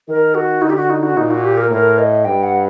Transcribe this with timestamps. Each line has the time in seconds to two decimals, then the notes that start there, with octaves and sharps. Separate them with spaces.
0.08 D#3 A#4
0.35 F#4
0.62 D3 D#4
0.70 G4
0.76 F#4
0.90 D#4
1.03 F#4
1.17 A#2 D#4
1.31 F#4
1.44 G4
1.57 A#4
1.70 A2 A#4
1.99 D#5
2.25 G2 G5
2.43 F#5